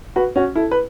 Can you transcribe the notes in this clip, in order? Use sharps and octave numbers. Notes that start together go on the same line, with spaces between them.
F#4 B4
C#4 F#4
E4 A4
B4